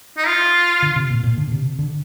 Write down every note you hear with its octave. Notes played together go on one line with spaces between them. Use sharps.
D#4
F4
D3
C3
A#2
A#2
D3
C3
D3